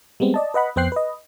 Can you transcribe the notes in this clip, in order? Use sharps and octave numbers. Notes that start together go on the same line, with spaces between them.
G3 G#3 B3 C4
D5 D#5 A5
B4 D#5 F#5 B5
F2 B3 C5 G5 F#6 C7
B4 D#5